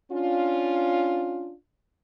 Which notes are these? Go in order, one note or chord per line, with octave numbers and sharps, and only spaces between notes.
C#4 D4 F4